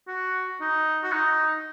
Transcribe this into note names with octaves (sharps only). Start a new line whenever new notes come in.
F#4
D#4
F#4
D#4